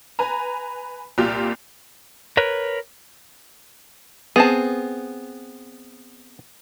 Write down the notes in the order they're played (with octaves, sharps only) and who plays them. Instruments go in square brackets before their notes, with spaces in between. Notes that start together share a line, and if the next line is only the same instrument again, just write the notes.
[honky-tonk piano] B4 G#5 A#5
C2 A#2 F4 G4
[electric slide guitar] A#4 B4 C#5
[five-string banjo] B3 A5 [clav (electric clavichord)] C4 G#4